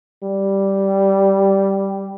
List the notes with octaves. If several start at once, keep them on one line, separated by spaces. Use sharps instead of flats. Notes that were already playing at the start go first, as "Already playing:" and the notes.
G3